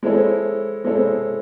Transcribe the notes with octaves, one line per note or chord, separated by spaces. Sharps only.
G#3 C4 E4 A4 C#5
G#3 C4 E4 A4 C#5